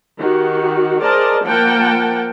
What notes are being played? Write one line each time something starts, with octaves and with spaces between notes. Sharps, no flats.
D#3 F#4 G4
G#4 A#4 C5 D5 D#5 A5
F3 A#3 A#4 F#5 G5 A5